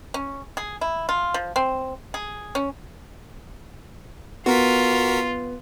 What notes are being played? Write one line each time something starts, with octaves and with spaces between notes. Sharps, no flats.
C#4
G#4
E4
F4
F3
C4
G#4
C#4
B3 F4 F#4 A#4 B6